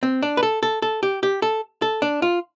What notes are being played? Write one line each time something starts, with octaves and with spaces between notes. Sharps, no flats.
C4
D4
B4
A4
A4
A4
G4
G4
A4
A4
D4
F4